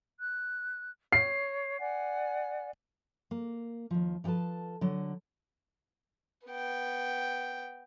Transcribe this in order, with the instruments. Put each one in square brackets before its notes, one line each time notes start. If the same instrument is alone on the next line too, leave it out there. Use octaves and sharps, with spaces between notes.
[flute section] F#6
[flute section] C#5 [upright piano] C7
[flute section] D5 F#5 G#5
[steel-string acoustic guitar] A#3
D#2 F3
F3 G4 A4 B4 A5
D3 F#3
[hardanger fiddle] B3 G5